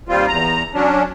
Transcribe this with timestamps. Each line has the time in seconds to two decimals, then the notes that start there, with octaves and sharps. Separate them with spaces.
0.09 D#2 G3 C4 F4
0.28 E2 A#5
0.74 F#3 C#4 D4